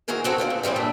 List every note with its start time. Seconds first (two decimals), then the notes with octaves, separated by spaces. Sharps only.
0.08 D#3 E3 F#4 G#4 A#4 C5
0.24 B3 C4 F#4 A4 A#4
0.38 F4 C5 D5 F5
0.50 A#2
0.63 C#3 E3 G3 C4 G#4
0.76 A#2 D4 A4 D5 E5